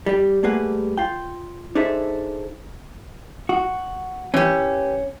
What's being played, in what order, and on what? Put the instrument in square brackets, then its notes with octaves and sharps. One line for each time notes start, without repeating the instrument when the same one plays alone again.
[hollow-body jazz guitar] G3 G4
G3 A3 A#3 G#4 B4 F#5
F4 G5
D4 D#4 G#4 A4 C5 E5
F#4
[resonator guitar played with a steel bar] E3 G4 [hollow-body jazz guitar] C#4